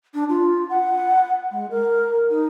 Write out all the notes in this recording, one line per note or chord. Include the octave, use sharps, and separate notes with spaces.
D4
F4
F#5
G#3
A#4
D#4